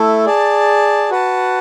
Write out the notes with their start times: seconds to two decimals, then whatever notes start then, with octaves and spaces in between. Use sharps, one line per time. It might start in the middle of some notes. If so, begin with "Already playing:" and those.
Already playing: A3 E4 A4
0.26 G#4 D5 A5
1.10 F#4 B4 F#5 A5